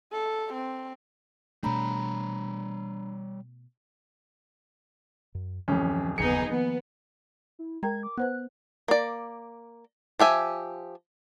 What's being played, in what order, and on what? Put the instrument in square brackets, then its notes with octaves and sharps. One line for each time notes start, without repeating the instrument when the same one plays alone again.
[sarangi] A4
C4
[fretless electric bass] B2 A3 [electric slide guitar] G3 C#5 [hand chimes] D4 A#5 B5
[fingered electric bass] F#2
[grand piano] D1 F2 [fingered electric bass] D#3 E3 [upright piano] C#4
[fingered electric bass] F#1 D#2 C#3 [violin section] B3 D#4 G#4 [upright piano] C#7
[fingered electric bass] D#3 F3 A#3 [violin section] B3
[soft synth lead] E4
[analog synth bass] G#3 [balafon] A#4 G5 A#5 [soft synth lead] G#6
[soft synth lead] D6
[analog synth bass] B3 [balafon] B4 C5 F#5 [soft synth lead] F#6
[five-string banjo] A#3 D5
F3 G4 E5 G#5